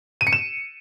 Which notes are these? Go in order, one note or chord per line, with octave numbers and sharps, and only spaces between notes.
D#7
C#7
E7